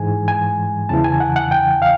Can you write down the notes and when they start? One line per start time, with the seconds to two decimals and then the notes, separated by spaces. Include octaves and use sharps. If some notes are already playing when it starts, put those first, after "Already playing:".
Already playing: G#2 E3 G#3 G#5
0.28 G#5
0.89 E2 C#3 E3 A5
1.04 G#5
1.20 F#5
1.36 F#5
1.51 G5
1.82 F5